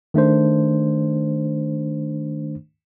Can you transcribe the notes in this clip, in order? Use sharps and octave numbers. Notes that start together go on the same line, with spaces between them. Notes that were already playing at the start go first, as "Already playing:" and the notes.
D#3 A3 D4 C5